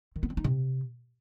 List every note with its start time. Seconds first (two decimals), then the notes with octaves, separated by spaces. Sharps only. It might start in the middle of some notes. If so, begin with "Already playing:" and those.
0.16 D#3
0.23 B3
0.30 C4
0.37 D#4
0.44 C3